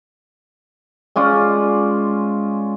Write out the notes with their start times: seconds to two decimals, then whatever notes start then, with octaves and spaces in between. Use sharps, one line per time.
1.16 G#3 C#4 F4 D5